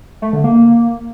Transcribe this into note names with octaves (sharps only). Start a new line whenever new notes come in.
A3
D3
A#3